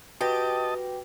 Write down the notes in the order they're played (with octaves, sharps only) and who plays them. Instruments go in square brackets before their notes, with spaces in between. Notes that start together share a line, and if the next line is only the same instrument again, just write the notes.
[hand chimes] F#4 B4 A#6 [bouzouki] G4 [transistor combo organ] D#5 A5